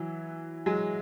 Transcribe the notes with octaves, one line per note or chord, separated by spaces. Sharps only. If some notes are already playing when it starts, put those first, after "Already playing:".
Already playing: E3 F#3
F#3 G#3